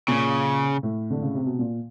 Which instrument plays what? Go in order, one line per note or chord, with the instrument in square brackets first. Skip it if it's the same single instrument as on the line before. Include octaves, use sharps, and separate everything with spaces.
[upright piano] A#2 [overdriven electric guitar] C#3
[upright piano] A2
D3
C#3
C3
B2
A#2